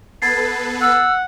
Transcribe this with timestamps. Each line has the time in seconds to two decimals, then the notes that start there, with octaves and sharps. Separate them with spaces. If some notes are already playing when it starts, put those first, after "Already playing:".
0.22 B3 A4 B4 G#6 A6 C7
0.81 F#5 E6